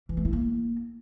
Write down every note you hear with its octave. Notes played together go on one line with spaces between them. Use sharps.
E3
A3
E4
A#3